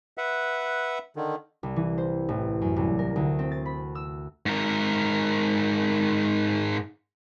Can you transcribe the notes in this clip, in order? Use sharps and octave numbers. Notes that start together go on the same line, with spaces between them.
B4 E5 F#5
D3 D#3
C2
E3
C5
A1
F#2
C2
A#4
D2
C4
A6
B5
E6
G#2 A#4